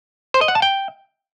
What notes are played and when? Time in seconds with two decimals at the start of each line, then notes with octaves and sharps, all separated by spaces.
0.34 C5
0.41 D#5
0.48 F#5
0.55 A5
0.62 G5